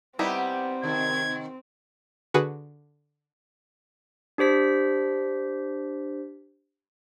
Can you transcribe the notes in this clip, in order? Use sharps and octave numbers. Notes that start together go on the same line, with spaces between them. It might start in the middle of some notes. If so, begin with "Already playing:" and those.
G3 B3 C4 D#4 E4 G4 B4
C3 D#3 G#6
D3 F#4 G#4 B4
D4 G4 C5 B6